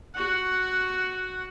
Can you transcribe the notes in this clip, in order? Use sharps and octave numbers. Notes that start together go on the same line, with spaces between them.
F#4 F#5